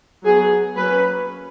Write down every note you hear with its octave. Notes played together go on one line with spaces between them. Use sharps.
F#3 B3 G#4
F#3 A#3 C#4 B4